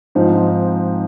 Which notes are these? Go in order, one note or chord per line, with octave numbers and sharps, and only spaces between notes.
G#2 F3 C4 D#4